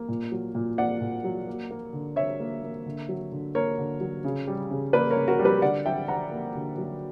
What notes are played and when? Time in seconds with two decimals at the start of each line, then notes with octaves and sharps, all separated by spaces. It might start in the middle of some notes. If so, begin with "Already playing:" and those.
Already playing: A#3
0.08 A#2
0.32 F#3
0.55 A#2
0.78 A#3 D5 F#5
1.01 A#2
1.24 F#3
1.47 A#3
1.71 A#3
1.93 D3
2.16 D3 C#5 E5
2.40 A#3
2.63 A#3
2.86 D3
3.09 F#3
3.32 D3
3.55 A#3 A#4 C#5
3.78 D3
4.01 F#3
4.24 C#3
4.47 G3
4.71 C#3
4.93 A#3 B4 D5
5.11 A#4 C#5
5.16 C#3
5.28 F#4 A#4
5.39 G3
5.45 G4 B4
5.62 D3 D5 F#5
5.86 F#3 E5 G5
6.08 D3 F#5 A#5
6.32 A#3
6.54 D3
6.78 F#3